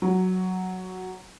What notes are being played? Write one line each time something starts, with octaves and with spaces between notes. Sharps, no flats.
F#3